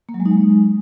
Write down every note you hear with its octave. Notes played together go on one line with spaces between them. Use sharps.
A#3
F#3
G#3
D#4
G#3